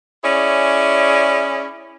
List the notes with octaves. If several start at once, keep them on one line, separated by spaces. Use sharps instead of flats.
C#4 E4 G#4 C#5 D5